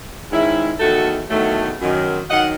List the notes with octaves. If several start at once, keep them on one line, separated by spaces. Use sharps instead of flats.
G#2 D#3 G#3 C#4 E4
E2 D#3 F#3 A3 F#4 A4
E2 D#3 F#3 A3
F#2 D#3 F#3
D#3 F#3 D#5 F#5